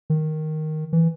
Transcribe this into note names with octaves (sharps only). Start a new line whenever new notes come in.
D#3
E3